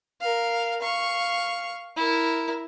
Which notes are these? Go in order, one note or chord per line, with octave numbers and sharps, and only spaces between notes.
A#4 F5
F5 C#6
E4 A#4